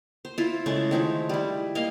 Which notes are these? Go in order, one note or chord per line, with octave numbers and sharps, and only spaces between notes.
C5
E4 F4
C#3 G#3 A3
D#3 F3 D#4 E4
G3 E4
A#3 D#5 F5